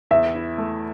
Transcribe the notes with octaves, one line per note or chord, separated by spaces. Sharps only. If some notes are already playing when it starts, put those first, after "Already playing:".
E2 E5
E4
A3